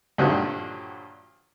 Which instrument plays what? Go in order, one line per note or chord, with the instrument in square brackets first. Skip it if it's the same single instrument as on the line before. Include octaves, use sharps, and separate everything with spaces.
[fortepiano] G2 A#2 D3 D#3 F3 F#3